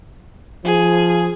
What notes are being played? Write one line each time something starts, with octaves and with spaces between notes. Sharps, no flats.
F3 G#4